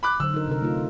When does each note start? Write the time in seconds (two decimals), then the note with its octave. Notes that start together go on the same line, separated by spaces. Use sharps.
0.03 B5 D6 F#6
0.20 D3 F#3 C5 E6
0.34 D#4 A#4
0.48 C3 A#4
0.62 A3 D#4 F4